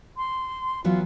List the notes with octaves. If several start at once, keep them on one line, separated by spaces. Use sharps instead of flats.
C6
E3 F#3 B3 F4